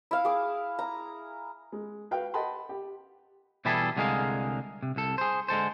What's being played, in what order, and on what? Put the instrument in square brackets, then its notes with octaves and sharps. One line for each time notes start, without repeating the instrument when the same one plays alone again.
[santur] E4 F5
G#4 D6
A#5
[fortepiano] G#3
F#4 B4 F5 G5
D#5 F#5 G5 A5 B5 C6
G4
[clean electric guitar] B2 E3 G3 E4 G#4 A4
C2 D3 G#3 G#4 A#4 F5
C3
C2 A4
G#4 C5
D3 G#3 A4 C5